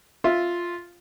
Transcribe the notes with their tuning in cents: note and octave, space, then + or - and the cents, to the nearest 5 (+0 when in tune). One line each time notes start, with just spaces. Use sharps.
F4 +0 E5 +0